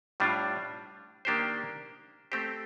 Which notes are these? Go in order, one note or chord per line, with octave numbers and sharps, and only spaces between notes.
A2 G3 D4 F4
D#3 A#3 D4 G4 C5
A3 C4 G4 C5